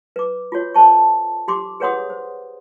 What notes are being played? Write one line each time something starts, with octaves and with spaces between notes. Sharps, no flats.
B4 D6
F4 F#4 C#5
A4 C5 A5 C#6
G4 C6 D6
G#4 B4 C#5 F#5 C6 D#6
C5